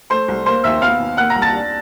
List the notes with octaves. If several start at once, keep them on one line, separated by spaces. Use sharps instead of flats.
A3 C5 C6
C2
A#3 C5 C6
D#2 E5 E6
B3 F5 F6
D#2
A#3 F#5 F#6
A#5 A#6
C2
A5 A6
D4